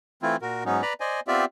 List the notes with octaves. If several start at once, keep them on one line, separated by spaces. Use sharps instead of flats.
E3 A3 C4 E4 F4
A#2 F#4 A#4
G#2 F#3 B3 C#4 D#4
B4 D5 A#5 B5
C5 D5 D#5 G#5
B3 C4 F4 G4 D5 E5